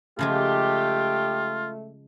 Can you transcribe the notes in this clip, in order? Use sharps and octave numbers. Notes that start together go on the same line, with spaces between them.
C#3 F3 G#3 A3 F4 G4